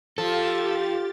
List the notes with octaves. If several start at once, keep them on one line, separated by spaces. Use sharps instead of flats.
F3 F4 G4 A4 A6